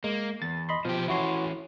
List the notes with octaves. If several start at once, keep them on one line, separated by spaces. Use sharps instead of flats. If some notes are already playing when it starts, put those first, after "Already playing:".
G#3 A#3
E2 A6
D#5 B5 C6
B2 F3 G4
E3 C#4 E4 F#4 C6